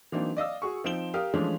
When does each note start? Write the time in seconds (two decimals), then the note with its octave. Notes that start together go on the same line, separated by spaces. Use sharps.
0.12 E3 F#3 A#3 C4 D4 D#4
0.37 D5 D#5 F5 E6
0.62 F#4 G#4 C#6
0.84 F3 C4 D#4 D7 E7 G7
1.14 G4 A#4 F5 D#6 F6
1.34 E3 F3 G#3 A3 C#4 D4